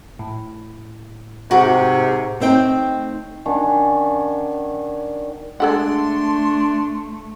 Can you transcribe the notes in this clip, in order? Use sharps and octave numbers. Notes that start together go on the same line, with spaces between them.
A2
G#2 C3 F#4 A#4
A3 C4 D#4 G5
D#3 C#4 D4 F#4
G#3 A3 D4 A4 F#5 C6